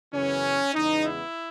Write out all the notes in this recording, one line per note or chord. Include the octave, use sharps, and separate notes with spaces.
F#2 C#3 E3 B3 C#4
E2 C#3 G#3 B3 D#4
E4